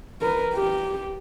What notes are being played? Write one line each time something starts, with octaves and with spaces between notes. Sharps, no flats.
A#4 B4
G4